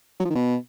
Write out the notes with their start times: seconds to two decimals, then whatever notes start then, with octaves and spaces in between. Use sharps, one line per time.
0.20 F#3
0.25 F3
0.31 D#3
0.36 B2